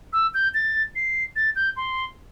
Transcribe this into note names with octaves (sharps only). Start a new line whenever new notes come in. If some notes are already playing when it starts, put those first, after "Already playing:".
E6
G6
A6
C7
A6
G6
C6